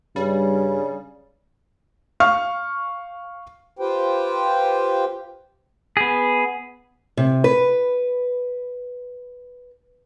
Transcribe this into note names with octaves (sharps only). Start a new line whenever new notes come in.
G2 C#3 G3
F5 C#6 F6
F4 G4 B4 C5 G5
B3 G#4
C3
B4